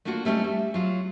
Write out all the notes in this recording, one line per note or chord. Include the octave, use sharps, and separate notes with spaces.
A3 A#3 D4 F4 F#4
G3 A3 C4 C#4 D#4
G3
F#3 F4